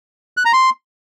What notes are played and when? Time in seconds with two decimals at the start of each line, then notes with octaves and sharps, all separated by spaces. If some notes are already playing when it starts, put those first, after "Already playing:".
0.37 F#6
0.45 A#5
0.53 C6